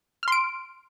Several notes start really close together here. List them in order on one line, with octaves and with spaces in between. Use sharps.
F6 C6 D7